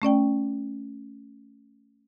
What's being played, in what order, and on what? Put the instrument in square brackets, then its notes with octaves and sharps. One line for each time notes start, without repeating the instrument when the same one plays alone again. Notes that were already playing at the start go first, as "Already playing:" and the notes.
[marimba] A3 C#4 D5 G5